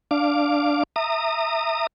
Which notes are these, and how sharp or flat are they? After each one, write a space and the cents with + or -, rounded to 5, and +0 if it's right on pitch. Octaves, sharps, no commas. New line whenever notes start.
D4 +0 F5 +0 D6 +0
E5 +0 A#5 -25 D#6 -20